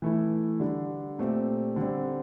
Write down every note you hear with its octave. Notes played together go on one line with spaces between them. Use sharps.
E3 A3 E4
D3 G3 D4
A#2 A3 C4 G4
D3 G3 C4